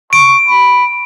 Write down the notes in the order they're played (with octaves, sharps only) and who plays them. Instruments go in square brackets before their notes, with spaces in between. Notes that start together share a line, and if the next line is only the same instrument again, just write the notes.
[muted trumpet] C#6 [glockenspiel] D7
[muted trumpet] B5